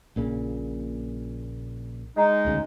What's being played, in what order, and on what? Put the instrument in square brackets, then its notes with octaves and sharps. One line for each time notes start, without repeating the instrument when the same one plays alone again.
[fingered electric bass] A#1 A#2 C#3
[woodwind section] G#3 D#4
[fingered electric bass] D#1 D2 C#3